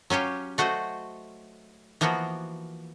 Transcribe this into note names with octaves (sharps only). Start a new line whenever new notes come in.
F#3 C#4 F4 G4
A3 F#4 C5 D#5
E3 F3 A#3 B3 F#4